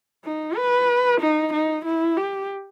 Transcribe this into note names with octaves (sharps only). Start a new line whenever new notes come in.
D#4
B4
D#4
D#4
E4
G4